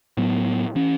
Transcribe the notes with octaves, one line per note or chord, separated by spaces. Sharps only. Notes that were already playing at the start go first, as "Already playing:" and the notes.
A2 F#3 B3
E3 C#4